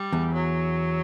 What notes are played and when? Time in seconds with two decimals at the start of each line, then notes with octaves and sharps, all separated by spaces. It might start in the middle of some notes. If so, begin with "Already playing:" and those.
Already playing: G3
0.13 E2
0.34 F#3